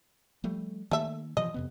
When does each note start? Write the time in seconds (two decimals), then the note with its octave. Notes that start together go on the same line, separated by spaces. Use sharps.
0.44 F3 G3 A3
0.91 D#3 A3 A#3 E5
1.37 B2 E3 F3 D#5
1.54 F2 C3 B3